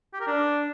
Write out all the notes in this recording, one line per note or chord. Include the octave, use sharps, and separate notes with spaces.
G4
A#4
D4